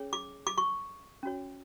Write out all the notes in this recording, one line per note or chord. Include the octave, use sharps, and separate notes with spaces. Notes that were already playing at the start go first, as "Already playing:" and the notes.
Already playing: C#4 G#4 C#5
D6
D6
C#6
C#4 F#4 C#5